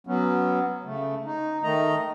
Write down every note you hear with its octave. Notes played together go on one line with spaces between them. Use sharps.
F#3 B3 C#4
C#3 A3
D#4
D#3 A3 D#5 A#5